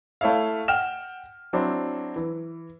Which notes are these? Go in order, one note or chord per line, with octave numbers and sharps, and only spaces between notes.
A3 E4 C#5 E5 F5
F#5 G5 F6 E7
F#3 C4 D4 E4
E3